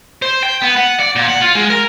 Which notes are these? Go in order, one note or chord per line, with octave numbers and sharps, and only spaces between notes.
C5
G5
B3
F#5
D5
A#2
F#5
F4
G#3
A#4